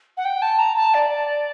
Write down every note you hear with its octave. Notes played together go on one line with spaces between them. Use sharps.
F#5
G5
A5
A#5
A5
D5